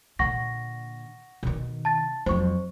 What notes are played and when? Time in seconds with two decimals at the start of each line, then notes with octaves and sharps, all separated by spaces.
0.19 A#2 D3 F#5 C#6 A#6
1.43 B2 D#3
1.85 A5 A6
2.26 F2 F#3 C5 C#6